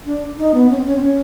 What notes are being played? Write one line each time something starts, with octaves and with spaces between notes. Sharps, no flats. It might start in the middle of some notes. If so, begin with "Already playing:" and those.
D4
D#4
B3
C#4
C4
C#4
C4
C#4